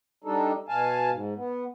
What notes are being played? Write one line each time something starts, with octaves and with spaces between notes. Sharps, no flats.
G3 D4 D#4 A4
B2 F5 G#5 A5
G#2
B3